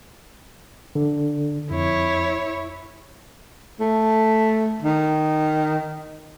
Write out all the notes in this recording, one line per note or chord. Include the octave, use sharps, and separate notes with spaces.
D3
F2 E4 C#5
A3
D#3